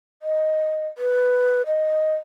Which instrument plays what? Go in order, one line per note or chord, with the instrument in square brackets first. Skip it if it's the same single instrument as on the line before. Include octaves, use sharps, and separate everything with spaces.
[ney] D#5
B4
D#5